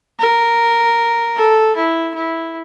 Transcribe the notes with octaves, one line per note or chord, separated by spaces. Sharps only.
A#4
A4
E4
E4